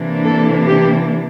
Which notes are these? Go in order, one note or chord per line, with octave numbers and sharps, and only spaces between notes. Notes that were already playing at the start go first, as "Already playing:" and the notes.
Already playing: C3 E3 A#3 D4
A4
G4